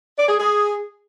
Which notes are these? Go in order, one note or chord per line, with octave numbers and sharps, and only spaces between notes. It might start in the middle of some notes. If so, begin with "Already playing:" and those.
D5
G#4
G#4